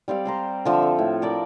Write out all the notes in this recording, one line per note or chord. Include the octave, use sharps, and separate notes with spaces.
G3 C4 D5 F5
C5 A#5 C6
D3 F3 E5
C4 A4
A2
A#4 D5 B5